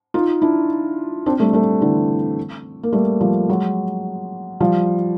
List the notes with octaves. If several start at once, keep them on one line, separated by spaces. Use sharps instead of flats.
D#4 F4
D4 E4
C4 D4
G3 A3
G3 A3
D3 E3
A#3
G3 A3
F3 G3
F#3 G#3
F3 G3